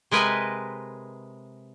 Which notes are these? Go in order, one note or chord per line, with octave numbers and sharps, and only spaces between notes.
C3 G#3 A#4 B4 D#5 G#5